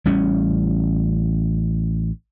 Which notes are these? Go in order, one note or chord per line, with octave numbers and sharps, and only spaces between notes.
A1 G3 C#4